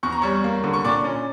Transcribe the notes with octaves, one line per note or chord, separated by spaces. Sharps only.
E2 C#6
A#5
G3 C#5 C#6
A#3
D3
C#6
A#2 D5 D6
C#4